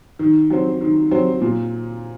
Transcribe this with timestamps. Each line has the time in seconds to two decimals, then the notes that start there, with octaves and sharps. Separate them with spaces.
0.19 D#3
0.50 F#3 C4
0.81 D#3
1.11 F#3 C4
1.41 A#2